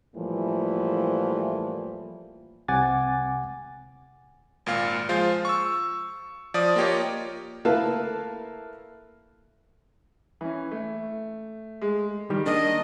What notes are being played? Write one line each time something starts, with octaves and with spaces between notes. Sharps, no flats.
A2 E3 F3 G3 A#3
C2 C3 F#5 G#5 D6 A6
G#1 A#2 F5
F3 G#3 F4 C5 F5
C#6 E6
F3 D5 D#6
A#3 F4 G4 C#5 D#5
A3 A#3 E4 B4 F5 A5
E3 C#4
A3
G#3
D#3 G3 G4
A#3 D4 D#4 D#5